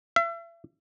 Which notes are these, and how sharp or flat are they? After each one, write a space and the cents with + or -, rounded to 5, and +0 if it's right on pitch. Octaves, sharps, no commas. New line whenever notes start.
E5 +35